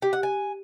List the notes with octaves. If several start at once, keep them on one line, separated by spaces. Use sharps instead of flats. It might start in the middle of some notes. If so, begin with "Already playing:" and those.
G4
F#5
G#5